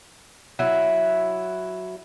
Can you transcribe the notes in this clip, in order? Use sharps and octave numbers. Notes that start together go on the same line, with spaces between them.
F#3 E4